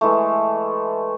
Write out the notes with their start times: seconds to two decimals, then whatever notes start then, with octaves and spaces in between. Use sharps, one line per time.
0.01 E3 G#3 A3